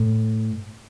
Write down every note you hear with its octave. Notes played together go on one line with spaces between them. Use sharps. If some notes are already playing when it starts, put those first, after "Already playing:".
Already playing: A2